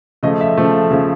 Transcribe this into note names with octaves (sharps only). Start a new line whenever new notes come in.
C#3 F3 A3 D#5
E5
C#3 F3 A3
C#3 F3 A3